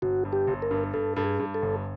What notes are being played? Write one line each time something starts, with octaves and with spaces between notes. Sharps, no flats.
G1 F#4
G2
G4
G1
A#4
G2
G2 A4
G2 A4
G#4
G2
A4
G1